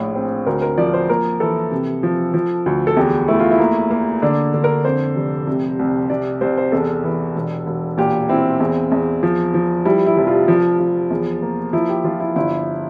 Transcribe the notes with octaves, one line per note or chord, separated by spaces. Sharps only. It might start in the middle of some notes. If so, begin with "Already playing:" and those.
Already playing: A#1 A2
C4
D2 A#4
A#4
F3 D5
C5
A#3 A#4
E3 A4
C3
F3
F3
D2
A4
E2 G4
A3 E4
F4
E4
A#3
A#3
D3 D4
D3
A#4
F2 C5
F1
C3
C2
C3 D5
C2 C5
C5
E2 A4
E3
E1
E1
A#2 G4
C4 E4
E2
E2
F3
F3
G3 E4
E4
F1
F4
F3
F3
E2
A#3
F3 E4
G4
F3 F4
E4
G1 E4